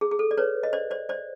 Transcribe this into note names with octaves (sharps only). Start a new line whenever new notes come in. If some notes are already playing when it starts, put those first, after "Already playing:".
G#4
G#4
A4
D5
B4 C#5
D#5
C5 D5
C5 D5
C5 D5